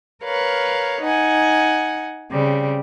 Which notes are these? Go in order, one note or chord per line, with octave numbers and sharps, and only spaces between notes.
A#4 B4 C#5 F5
D#4 F#5 G#5
C#3 G3 C4